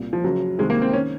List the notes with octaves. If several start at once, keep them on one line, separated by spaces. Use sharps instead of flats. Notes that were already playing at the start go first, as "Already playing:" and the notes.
Already playing: C2 A#2
F3
F#1 F#2 C#3 F#3
C2 C3 D#3 G#3
A#3
C4
D#3 C#4